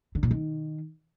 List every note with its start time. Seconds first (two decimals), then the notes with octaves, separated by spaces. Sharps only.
0.15 D3
0.23 A#2
0.31 D#3